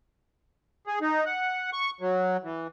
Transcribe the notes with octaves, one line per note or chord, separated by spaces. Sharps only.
G#4
D#4
F#5
C#6
F#3
E3